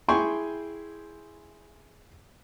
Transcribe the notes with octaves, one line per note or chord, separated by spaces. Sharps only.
E4 G#4 G5 G#5 C6 C#6